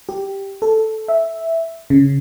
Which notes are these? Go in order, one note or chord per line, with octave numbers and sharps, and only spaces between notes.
G4
A4
E5
C#3